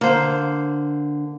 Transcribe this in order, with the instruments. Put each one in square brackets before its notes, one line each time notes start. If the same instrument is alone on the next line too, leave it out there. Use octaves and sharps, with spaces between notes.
[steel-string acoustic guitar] D3 [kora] A#3 C5